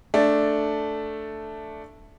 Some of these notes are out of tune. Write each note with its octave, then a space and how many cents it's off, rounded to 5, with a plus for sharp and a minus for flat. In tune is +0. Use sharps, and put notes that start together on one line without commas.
A3 +0 D4 +0